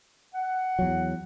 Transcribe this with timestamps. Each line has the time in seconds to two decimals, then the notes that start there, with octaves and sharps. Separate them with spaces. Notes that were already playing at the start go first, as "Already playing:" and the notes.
0.34 F#5
0.79 E2 F#3